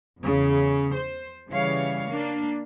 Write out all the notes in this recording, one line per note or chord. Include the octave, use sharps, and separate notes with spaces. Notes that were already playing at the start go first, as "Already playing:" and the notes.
E2 C#3
C5
C#3 E3 G3 C#5 F5
A#3 D4